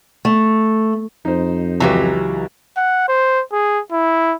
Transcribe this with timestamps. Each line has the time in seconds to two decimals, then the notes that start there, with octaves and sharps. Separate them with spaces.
0.25 A3
1.25 F2 D#4 C5
1.80 C#2 E3 F#3 G4 A#5
2.77 F#5
3.08 C5
3.52 G#4
3.92 E4